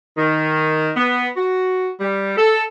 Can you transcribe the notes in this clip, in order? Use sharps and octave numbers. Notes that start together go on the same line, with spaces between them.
D#3
B3
F#4
G3
A4